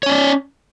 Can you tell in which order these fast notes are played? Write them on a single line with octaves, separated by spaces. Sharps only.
C#5 C#4 D5